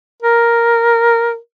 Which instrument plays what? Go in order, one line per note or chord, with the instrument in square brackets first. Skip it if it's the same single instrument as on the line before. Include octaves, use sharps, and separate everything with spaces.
[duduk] A#4